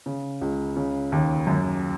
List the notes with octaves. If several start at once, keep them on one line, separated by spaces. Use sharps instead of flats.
C#3
C#2
C#3
D#2
F#2